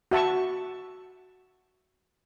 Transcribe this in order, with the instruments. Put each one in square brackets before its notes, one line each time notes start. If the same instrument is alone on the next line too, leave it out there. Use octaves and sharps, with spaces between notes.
[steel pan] F#4 E5 A5 C#6